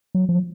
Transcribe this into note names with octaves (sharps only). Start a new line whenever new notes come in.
F#3
F3